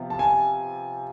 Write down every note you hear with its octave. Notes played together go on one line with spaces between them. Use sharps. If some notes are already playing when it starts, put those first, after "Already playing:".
Already playing: C3 F3 B3 F4
A5
G#5